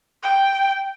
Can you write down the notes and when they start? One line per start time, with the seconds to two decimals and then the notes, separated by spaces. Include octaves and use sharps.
0.23 G5